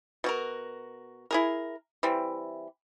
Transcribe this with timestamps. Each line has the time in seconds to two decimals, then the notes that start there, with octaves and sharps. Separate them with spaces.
0.24 B2 F#4 A#4
1.31 E4 G#4 A#4
2.03 E3 G3 C4